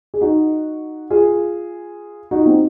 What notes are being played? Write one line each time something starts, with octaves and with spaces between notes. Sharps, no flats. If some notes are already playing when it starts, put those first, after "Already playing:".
G#4
D#4 F#4
F4 G#4
D#4 F#4
F4
C4 D#4